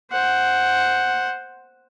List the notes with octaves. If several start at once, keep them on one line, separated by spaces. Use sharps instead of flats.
C5 F#5